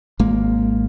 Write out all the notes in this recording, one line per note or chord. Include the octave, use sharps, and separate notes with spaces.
G#1 G#3 A#3